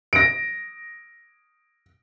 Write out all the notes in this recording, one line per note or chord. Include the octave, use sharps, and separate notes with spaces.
A#6 D7